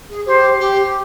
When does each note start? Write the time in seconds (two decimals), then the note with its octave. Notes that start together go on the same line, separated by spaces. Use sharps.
0.09 G#4
0.26 G4 C5
0.59 G4